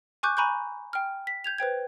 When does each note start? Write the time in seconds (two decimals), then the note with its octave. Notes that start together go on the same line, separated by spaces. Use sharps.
0.23 G#5 C#6 D6 F#6 G6
0.37 G#5 A#5 B5 C#6 F#6 G6
0.93 G5 F6
1.27 B6
1.44 G6 G#6 F7
1.58 B4 C5 G5 G#6